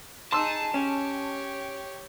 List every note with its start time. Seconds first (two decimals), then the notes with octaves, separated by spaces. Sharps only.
0.32 D#4 G#4 A5 C6 E6
0.74 C#4 G4 C#5